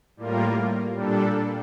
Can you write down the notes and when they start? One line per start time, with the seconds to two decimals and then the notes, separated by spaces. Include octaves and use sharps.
0.17 A2 G3 A#3 F4 A#4
0.94 A#2 G3 D4 A4